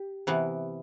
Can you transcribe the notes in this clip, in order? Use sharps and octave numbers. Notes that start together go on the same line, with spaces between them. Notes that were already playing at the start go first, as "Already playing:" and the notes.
Already playing: G4
C3 E3 B3